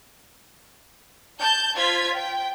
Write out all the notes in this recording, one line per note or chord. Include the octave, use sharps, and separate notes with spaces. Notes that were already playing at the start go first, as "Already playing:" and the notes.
A5 G6
F4 C5 G#6 B6
G5